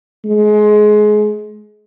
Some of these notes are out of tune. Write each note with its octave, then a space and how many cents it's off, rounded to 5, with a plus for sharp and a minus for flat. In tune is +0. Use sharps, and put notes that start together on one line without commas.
G#3 +25